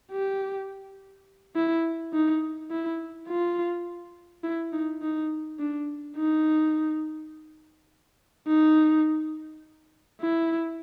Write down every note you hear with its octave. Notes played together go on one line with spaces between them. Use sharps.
G4
E4
D#4
E4
F4
E4
D#4
D#4
D4
D#4
D#4
E4